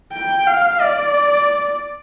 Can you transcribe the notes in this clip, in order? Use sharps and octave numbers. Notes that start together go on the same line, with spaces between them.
G5
F5
D5